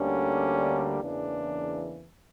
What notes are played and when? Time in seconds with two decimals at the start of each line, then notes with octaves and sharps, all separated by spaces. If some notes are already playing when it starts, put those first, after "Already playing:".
Already playing: D2 D3 G3 A#3 C#4
0.99 E2 C#3 E3 A#3 D4